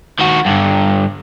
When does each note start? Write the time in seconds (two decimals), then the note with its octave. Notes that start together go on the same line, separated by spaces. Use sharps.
0.19 D#3 F#4
0.45 G2 D3